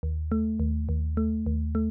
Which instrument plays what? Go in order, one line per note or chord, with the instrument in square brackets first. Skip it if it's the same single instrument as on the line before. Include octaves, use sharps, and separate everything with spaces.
[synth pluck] D#2
A3
D#2
D#2
A3
D#2
A3